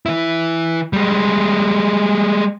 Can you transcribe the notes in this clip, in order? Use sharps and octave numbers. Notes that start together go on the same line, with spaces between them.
E3 E4
G3 G#3